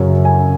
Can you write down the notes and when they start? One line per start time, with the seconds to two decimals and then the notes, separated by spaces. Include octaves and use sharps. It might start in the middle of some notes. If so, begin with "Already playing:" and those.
Already playing: F#2 C#3 F#3 C#5
0.25 G#5